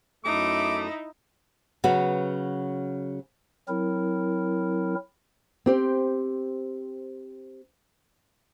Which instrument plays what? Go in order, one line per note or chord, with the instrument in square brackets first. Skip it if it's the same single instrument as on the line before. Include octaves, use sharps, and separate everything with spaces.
[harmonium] F#2 A3 A4 [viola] D#4 E4 [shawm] D6
[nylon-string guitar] C#3 F#3 B3 F#4
[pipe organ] F#3 C4 E4 A#4
[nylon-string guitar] C4 G4 C5